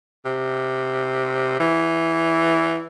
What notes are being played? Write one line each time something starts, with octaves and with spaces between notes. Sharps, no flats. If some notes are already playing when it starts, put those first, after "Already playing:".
C3
E3